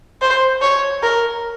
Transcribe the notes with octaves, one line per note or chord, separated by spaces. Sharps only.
C5
C#5
A#4